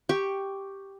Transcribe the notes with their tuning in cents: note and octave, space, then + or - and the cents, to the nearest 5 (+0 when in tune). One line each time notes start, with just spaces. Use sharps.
G4 +0 C#6 +0